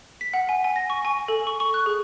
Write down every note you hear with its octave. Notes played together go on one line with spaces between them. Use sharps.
B6
F#5
G#5
G#5
A#6
C#6
G#5
A4
C#6
C#6
F#6
G#4